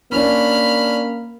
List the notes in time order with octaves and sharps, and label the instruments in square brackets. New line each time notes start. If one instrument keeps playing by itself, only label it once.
[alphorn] A#3 [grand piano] C#4 D4 [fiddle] B5 F6